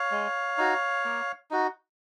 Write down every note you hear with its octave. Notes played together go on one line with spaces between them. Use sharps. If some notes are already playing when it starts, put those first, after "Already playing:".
Already playing: C#5 F5
G#3
D#4 F#4
A#3
D#4 F#4